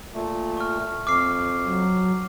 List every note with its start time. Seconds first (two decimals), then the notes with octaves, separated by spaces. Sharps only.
0.14 A#2 A3
0.57 C#6 F6
1.07 F2 D6 F6 C7
1.65 F#3